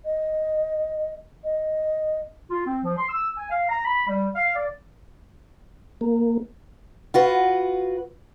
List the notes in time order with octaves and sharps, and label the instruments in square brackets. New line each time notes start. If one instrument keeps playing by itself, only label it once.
[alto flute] D#5
D#5
[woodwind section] F4
C4
F3
C6
E6
G#5
F5
A#5
B5
G3
F5
D5
[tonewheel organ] A#3
[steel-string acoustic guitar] F4 F#4 B4